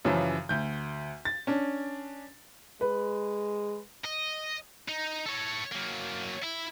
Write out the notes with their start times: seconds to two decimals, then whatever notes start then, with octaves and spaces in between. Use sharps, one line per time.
0.05 F#2 C#3 E3 F3
0.49 D2 G6
1.25 A6
1.47 C#4 D4
2.81 G#3 B4
4.04 D#5
4.88 D#4
5.26 A4 C#5
5.72 F#3 A#3
6.44 E4